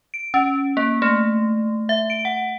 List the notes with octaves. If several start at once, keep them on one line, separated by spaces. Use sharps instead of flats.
D7
C#4
A#3
A3
E5
D7
F#5